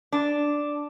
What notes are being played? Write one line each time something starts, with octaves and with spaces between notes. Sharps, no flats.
D4